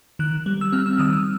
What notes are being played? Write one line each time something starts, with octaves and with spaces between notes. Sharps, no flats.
D#3 F#6
G3
E6
C4 F6
E6
D#3 D#6
E6